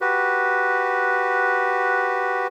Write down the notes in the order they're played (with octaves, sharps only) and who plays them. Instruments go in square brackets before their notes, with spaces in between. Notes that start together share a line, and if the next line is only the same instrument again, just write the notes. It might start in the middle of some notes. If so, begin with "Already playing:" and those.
[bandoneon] F#4 G4 B4